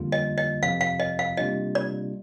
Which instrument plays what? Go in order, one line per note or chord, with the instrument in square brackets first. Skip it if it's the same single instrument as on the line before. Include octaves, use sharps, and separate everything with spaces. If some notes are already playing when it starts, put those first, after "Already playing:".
Already playing: [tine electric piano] F2 D3 G3 A#3 F4
[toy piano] D#5
D#5
[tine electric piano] F2 C3 F3 [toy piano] F5
[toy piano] F5
D#5
F5
[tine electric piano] C3 G3 A#3 D4 F4 [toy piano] D#5
[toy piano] D5